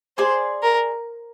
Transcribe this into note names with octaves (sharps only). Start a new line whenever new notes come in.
G#4 C5 D5 G#5 C6
A#4